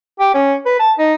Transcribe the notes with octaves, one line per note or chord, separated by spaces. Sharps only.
G4
C#4
B4
A5
D#4